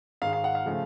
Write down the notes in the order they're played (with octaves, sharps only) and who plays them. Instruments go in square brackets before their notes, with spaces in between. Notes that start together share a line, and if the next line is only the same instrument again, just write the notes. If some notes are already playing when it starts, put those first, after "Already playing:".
[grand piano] G#2 D#3 G#3 F5
F5
F#5
F5
C#3 F3 A3